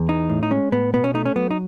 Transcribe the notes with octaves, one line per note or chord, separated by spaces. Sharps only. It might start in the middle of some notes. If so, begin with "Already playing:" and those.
Already playing: E2
E3 D#4
A2
D#4
G#3 C#4
A2 B3
B2 B3
C#4
A3 D#4
C#4
F#3 B3
D#4